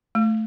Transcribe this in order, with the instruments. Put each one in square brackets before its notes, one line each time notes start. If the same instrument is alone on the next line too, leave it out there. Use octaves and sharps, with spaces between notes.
[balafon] A3